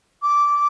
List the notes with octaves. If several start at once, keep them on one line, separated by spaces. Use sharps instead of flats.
D6